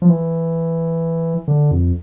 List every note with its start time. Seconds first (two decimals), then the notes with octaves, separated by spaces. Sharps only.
0.02 F3
0.09 E3
1.48 D3
1.71 F2